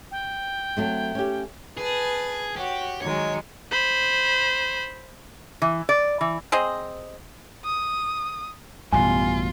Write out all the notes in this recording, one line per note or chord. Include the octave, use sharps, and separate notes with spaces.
G5
F#3 A3 C4
C#4 G4
G#4 B4 A5
F#4 G4 C#5
D#3 F#3 G#3 C#5
C5 B5
E3
D5
E3
C4 G#4 C5 D#5
D#6
A1 F#2 B2 G3 F4 G#5